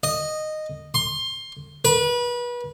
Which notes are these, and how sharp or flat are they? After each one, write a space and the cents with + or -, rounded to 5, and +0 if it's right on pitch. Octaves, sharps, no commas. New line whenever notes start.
D#5 -10
C6 +20
B4 -30